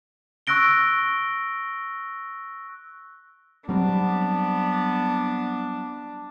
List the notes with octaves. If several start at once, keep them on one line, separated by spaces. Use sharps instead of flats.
C#6 E6 F#6 A#6 D7 G7
F#3 G3 B3 C4 D4